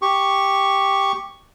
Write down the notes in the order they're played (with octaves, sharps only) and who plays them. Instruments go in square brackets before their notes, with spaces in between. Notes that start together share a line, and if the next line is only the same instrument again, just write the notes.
[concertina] G4 C#6